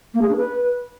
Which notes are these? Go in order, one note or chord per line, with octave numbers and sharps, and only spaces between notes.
A#3
G#4
D4
B4